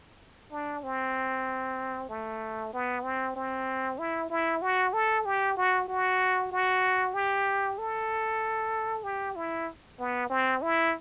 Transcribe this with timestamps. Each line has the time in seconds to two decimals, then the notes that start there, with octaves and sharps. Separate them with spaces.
0.51 D4
0.84 C4
2.09 A3
2.73 B3
3.04 C4
3.36 C4
3.98 E4
4.30 E4
4.62 F#4
4.93 A4
5.25 G4
5.57 F#4
5.88 F#4
6.52 F#4
7.14 G4
7.78 A4
9.04 G4
9.36 E4
9.99 B3
10.30 C4
10.62 E4